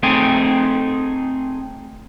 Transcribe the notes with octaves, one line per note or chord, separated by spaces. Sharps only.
A3 C4 D#4 G#4 G5 G#5